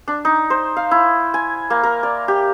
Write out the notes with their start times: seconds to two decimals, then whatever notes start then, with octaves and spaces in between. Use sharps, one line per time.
0.08 D4
0.25 D#4
0.50 C5
0.76 F5
0.91 E4
1.34 G#5
1.70 A#3
1.83 A#4
2.03 D5
2.28 G4